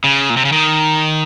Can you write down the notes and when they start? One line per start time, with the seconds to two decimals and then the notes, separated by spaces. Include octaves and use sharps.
0.04 C#3
0.30 A#2
0.37 C3
0.45 C#3
0.52 D#3